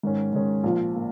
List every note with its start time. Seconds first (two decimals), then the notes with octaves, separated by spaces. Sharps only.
0.03 G#2 D#3 G#3 C#4
0.33 G#2 D#3 G#3 C#4
0.64 A#1 A#2 F3
0.96 A#2